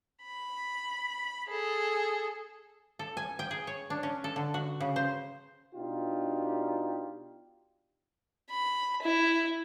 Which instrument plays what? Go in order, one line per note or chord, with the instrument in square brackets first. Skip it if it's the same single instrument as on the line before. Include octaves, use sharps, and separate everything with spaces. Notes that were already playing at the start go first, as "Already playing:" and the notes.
[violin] B5
G#4 A4
[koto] A4
G#5
G5
G#4
C#5
D4
C#4
A4
D3
F#4
C#3
C5
[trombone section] B2 D4 D#4 F4 G4
[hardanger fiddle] B5
E4